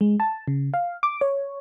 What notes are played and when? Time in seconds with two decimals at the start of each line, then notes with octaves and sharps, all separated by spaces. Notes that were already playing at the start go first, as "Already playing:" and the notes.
0.01 G#3
0.20 A5
0.48 C#3
0.74 F5
1.03 D6
1.21 C#5